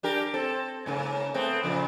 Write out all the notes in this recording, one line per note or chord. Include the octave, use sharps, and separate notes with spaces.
D4 G4 A#4
C4 A4
G#2 C#3 A#3
A3 B3 C4
A#2 C#3 F3